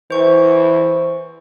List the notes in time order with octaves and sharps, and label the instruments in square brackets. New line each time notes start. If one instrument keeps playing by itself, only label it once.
[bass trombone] E3 [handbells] C5 C#6